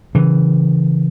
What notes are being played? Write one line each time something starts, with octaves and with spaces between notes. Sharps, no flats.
C#3 E3